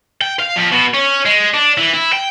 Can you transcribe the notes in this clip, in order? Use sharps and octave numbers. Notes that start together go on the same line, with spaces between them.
G5
F5
F2
B2
C#4
G#3
D4
E3
E4
G5